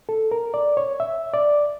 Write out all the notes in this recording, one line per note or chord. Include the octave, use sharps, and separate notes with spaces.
A4
A#4
D5
C#5
E5
D5